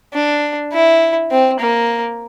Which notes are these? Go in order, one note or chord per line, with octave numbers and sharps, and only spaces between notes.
D4
E4
C4
A#3